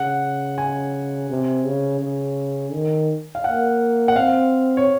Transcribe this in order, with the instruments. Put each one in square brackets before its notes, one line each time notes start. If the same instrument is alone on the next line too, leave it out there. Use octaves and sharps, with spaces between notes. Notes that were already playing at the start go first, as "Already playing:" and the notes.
Already playing: [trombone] C#3 [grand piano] F#5
[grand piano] G#5
[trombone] C3
C#3
C#3
D#3
[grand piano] F5
[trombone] A#3 [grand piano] F#5
[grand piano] F#5
[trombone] C4 [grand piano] F5
[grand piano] C#5